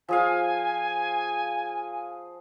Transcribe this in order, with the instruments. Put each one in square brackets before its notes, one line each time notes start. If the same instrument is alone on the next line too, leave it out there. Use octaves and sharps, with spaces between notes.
[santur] F3 G#4 F5 [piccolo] G#5